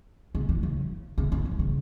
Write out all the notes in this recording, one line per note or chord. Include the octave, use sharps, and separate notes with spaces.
C#3
E3
C#3
C#3
C#3
E3
C#3